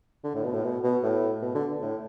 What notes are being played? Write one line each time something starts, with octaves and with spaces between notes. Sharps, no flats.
D3
A2
B2
A2
B2
B2
A2
B2
D3
A2